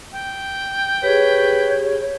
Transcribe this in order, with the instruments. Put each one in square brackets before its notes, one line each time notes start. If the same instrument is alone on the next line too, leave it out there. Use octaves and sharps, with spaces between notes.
[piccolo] G5
[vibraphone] G4 G#4 [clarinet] B4 [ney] C#5